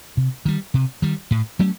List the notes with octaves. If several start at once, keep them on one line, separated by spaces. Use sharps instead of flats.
C3
D#3 G3
C3
D#3 G3
A2
F#3 A3 C#4